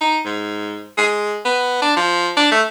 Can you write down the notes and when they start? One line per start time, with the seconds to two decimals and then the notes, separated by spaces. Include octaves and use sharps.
0.01 D#4
0.25 G#2
0.97 G#3
1.45 B3
1.82 D4
1.96 F3
2.37 D4
2.52 A3